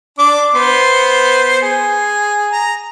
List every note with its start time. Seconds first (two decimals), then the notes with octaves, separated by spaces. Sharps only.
0.19 D4 D6
0.55 B3 C5 C6
1.62 G#4
2.52 A#5